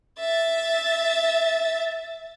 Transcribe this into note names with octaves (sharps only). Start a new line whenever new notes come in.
E5 A6